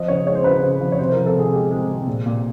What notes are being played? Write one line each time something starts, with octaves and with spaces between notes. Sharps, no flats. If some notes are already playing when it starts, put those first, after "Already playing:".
Already playing: F3 D#5
C#3 C#5
G#3 C#5
C5
C#3 B4
C5
C#3
F3
C#5
C3 C5
F3 A#4
A4
C3 G#4
G#3 G4
G#3
C3
A#2
A#2